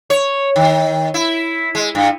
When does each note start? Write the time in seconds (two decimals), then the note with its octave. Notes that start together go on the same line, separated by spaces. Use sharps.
0.10 C#5
0.56 D#3
1.14 E4
1.75 G#3
1.95 G2